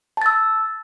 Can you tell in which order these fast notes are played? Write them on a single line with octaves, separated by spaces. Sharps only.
A5 A6 E6